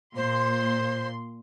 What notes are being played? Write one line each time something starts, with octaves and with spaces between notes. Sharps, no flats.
A#2 C5 C6